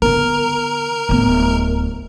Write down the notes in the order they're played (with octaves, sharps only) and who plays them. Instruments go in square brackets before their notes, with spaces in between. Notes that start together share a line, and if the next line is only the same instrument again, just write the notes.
[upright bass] D3 B3 [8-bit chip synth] A#4
[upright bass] D1 B3